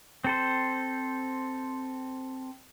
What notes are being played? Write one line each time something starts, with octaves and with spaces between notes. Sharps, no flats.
C4 A4 C5